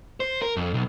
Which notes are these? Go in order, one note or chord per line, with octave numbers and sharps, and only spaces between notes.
C5
A#4
F2
B1